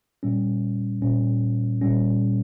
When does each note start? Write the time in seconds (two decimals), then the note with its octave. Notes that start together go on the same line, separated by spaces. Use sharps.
0.23 A#2 G3 C#4
1.02 A#2 G3 C#4
1.81 A#2 G3 C#4